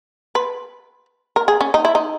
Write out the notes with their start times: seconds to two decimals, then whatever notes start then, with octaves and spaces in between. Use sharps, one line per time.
0.35 B4
1.36 A#4
1.48 G#4
1.61 C#4
1.74 D#4
1.85 E4
1.95 D#4